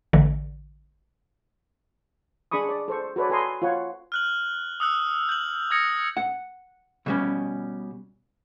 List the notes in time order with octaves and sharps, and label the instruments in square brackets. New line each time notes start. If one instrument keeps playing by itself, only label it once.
[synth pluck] A1 D3 E3
[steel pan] D4 G#4 B5 C#6 D#6
D5
A4 C5 C#6
F#4 A4 B4 C#5 D5
A4 B4 G#5 A#5 C6 D#6
F4 C#5 F#5
[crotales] F6 F#6 F#7
D#6 E6 F#6
G6 F#7
D#6 E6 G#6 A#6 C#7
[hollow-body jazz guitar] F#5
B2 G3 C#4